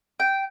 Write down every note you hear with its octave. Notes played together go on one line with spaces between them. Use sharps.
G5